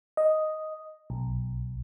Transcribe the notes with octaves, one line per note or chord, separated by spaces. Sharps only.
D#5
B1